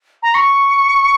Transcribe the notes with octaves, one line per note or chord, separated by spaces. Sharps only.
A#5
C#6